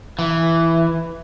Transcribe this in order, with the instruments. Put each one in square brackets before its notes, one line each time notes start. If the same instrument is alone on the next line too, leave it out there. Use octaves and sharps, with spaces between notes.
[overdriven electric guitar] E3